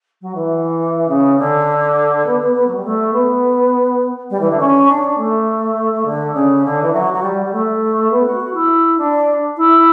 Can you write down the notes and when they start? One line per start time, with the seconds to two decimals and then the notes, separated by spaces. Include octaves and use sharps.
0.21 F#3
0.35 E3
1.08 C#3
1.38 D3
2.25 B3
2.41 B3
2.55 B3
2.67 F#3
2.76 G3
2.84 A3
3.13 B3
4.30 G3
4.40 E3
4.50 D3
4.60 C#4
4.88 D4
5.03 D4
5.18 A3
6.05 D3
6.34 C#3
6.65 D3
6.82 E3
6.93 F#3
7.14 F#3
7.22 G3
7.45 G3
7.52 A3
8.11 B3
8.26 F#4
8.40 F#4
8.54 E4
8.98 D4
9.57 E4